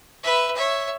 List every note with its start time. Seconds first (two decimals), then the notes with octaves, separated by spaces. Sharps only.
0.23 B4 E5
0.56 C#5 E5